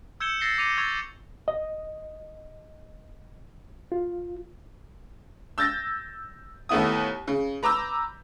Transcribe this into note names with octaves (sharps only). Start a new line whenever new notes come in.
E6 G6 G#6 C#7 E7 G7
E6 A6 A#6 C7 C#7 G7
D6 A#6 C#7 D#7 F7
C#6 E6 G#6 A6 F7
D#5
F4
E6 G6 A6 A#6
D#2 A3 B3 E4 D#6
C#3
B4 A#5 D6 E6 G6